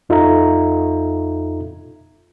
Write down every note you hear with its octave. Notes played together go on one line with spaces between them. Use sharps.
F2 D#4 F4 A4 E5 A#5